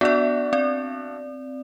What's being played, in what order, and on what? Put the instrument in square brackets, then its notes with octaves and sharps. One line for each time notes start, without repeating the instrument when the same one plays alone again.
[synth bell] B3 D5 [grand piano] D4 F#4 E5
[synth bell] C4 D5